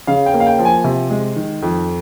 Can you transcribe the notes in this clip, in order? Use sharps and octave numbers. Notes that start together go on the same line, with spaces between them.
C#3 F5
G5
A#3
F5
G5
F3
G#5
C3
G#3
D#3
F2